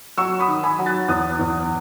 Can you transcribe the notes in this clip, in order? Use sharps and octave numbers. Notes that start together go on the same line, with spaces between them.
F#3 C#6 E6
B5 D#6
D#3
G#5 B5
F#3
F#6 A6
E2 D#6 F#6
E2